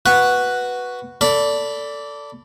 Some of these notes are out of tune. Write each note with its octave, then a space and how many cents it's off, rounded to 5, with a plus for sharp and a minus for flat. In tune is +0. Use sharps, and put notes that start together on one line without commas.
F#4 +0 B4 +0 F#5 +0
A4 +20 D5 -20 B5 +0